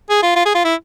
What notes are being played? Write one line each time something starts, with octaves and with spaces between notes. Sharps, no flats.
G#4
F4
F4
G#4
F4
E4